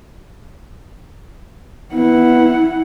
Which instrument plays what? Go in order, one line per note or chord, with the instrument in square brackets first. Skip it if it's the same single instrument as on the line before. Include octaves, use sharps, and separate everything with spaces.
[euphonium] B3 [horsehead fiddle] E4 F#5